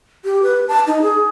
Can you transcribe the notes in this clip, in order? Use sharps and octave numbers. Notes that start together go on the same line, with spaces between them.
G4
B4
A5
D#4
G#4